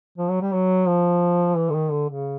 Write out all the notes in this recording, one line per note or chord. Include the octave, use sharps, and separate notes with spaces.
F3
F#3
G3
F#3
F3
E3
D3
D#3
D3
C#3